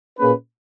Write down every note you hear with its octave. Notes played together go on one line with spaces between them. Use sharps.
A#2 A#3 C#4 G#4 B4